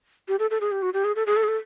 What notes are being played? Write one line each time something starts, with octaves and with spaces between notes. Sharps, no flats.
G4
A4
A4
G#4
G4
F#4
G4
G#4
A4
G#4
A4
G#4
A4